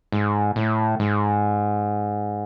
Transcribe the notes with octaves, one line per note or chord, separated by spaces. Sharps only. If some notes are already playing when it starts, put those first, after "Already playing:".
G#2
A2
G#2